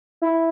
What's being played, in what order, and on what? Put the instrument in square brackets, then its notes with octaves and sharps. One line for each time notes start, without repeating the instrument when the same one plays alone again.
[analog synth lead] E4